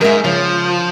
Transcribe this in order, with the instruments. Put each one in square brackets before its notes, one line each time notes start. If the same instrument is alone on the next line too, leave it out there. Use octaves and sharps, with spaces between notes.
[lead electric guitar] F2 G#2 [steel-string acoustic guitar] A#4 D#5 E5
[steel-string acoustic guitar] C#3 [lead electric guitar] F3